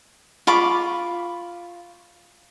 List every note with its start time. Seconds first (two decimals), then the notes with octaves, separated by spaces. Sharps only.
0.47 F4 B5 C#6 D6